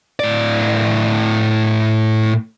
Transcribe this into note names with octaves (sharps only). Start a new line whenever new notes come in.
A2 D5